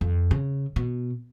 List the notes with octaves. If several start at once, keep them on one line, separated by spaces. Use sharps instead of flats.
F2
C#3
B2